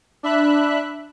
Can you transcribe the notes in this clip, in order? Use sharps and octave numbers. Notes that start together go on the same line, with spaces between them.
D4 E5 B5 F#6